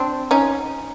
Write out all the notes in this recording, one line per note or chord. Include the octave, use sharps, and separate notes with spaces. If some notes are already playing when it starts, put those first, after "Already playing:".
Already playing: C4 D4
C#4 D#4